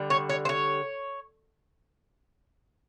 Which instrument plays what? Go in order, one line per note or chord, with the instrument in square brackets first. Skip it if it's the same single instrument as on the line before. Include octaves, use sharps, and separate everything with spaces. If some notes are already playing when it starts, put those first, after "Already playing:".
Already playing: [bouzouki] D3 G3
C#5
C#5
C5
C#5